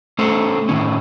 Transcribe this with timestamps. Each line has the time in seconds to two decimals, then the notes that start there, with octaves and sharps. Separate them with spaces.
0.19 A3 C#4 A4 C5
0.69 A2 D#3 C#4